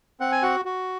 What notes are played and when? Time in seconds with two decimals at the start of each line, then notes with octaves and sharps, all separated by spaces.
0.20 C4 F#5
0.32 G#5
0.43 F#4 F#5
0.65 F#4